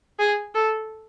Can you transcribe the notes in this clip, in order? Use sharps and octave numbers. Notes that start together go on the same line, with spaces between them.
G#4
A4